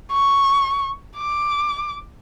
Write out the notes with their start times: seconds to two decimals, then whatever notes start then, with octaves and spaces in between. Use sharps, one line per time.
0.12 C#6
1.17 D6